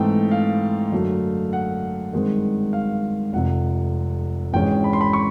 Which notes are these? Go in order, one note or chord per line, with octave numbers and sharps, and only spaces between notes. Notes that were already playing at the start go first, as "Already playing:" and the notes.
Already playing: G#2 E3 A3 C4 G5
F5
F#2 D3 F#3 A3
F#5
G2 D#3 G#3 C4
F5
F1 F2 C3 F#5
G#1 G#2 E3 G#3 C#4 G5
B5
C6
B5
C#6